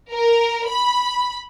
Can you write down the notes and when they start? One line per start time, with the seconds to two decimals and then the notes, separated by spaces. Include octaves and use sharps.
0.12 A#4
0.68 B5